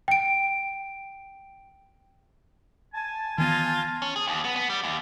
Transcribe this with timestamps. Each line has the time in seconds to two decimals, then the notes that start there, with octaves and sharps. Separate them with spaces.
0.08 G5 D7
2.94 G#5 A5
3.38 D#3 E3 B3 D#4 F4 G#5
4.02 C#4
4.16 G#4
4.28 D#2
4.45 B3
4.56 B3
4.70 G3
4.83 D#2